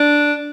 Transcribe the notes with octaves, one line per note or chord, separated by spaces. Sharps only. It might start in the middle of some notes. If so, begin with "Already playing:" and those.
Already playing: D4